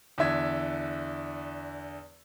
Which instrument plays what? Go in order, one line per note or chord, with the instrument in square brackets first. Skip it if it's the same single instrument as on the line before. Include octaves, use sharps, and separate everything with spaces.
[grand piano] E2 D3 E5 G#6